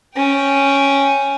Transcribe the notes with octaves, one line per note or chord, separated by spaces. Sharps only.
C#4 G5